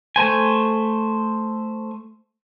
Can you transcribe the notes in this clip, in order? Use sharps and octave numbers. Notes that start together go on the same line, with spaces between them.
A3 C5 G#5